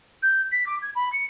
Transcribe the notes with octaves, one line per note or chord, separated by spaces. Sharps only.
G6
B6
D6
G#6
B5
C#7